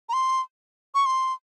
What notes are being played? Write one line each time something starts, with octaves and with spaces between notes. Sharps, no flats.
A#5
C6
C#6
C6